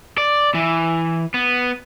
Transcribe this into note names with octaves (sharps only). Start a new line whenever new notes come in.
D5
E3
B3